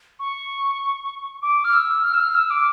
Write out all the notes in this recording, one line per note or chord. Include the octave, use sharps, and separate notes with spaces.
C#6
D6
F6
E6
F6
E6
F6
E6
D6